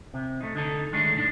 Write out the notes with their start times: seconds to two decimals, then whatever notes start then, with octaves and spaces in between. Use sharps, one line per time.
0.14 C3
0.41 A3 D#4
0.55 D3 D#4 A4
0.93 D3 D#3 G#3 A3 D4 D#4
1.17 C2 A2 D4